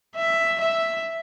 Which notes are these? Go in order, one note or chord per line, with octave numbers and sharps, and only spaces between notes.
E5
E5